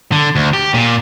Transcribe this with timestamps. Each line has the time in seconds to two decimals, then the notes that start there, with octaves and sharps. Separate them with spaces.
0.12 D3
0.36 D2
0.53 G4
0.74 A#2